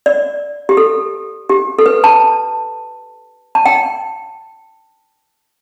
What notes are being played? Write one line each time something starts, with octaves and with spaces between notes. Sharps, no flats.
D5
G4
A4
G4
A4
B4
A5
A5
G5